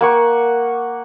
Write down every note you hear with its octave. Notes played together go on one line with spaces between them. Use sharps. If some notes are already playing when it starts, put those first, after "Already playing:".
A#3 F#5 C#6